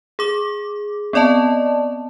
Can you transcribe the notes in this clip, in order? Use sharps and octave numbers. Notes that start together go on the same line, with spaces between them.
G#4 D6
B3 C4 D5 D#5 A5